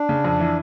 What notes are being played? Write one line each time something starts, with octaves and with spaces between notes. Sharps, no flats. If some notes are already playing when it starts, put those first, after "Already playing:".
Already playing: D4
C#3
F2
E3